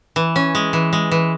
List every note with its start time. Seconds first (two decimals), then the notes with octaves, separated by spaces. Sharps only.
0.16 E3
0.36 C#4
0.55 G#3
0.73 E3
0.93 G#3
1.11 E3